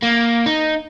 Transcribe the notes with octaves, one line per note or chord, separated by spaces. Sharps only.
A#3
D#4